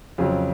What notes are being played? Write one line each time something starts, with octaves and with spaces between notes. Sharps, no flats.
F2 C#3 F#3 G#4